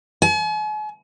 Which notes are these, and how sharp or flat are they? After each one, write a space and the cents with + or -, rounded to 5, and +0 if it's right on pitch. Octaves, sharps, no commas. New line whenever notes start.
G#5 +45